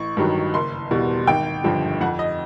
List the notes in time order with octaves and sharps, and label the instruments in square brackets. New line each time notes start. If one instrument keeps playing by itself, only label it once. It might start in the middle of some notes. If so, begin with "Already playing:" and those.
Already playing: [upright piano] A1 C#6
G2 D#3 F#3
F#1 C6
E2 B2 G3
G#1 G5
G2 D3 F3
F2 F#5
D#5